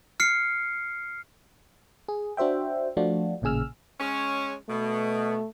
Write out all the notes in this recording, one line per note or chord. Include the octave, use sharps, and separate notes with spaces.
F6 C7 C#7
G#4
D4 F#4 C5 E5 G5
F3 A3 D4 F4 F#4
A1 A#2 C#3 G#4 E6 F6
G#3 C#4
B2 A3